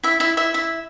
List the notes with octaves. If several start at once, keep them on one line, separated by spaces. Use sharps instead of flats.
E4 E5
E4 E5
E4 E5
E4 E5